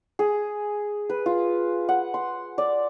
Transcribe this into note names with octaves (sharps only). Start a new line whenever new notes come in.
G#4
B4
F4
F#5
C6
D5